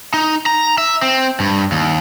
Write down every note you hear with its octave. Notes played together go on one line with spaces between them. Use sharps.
D#4
A#5
E5
C4
G2
D#2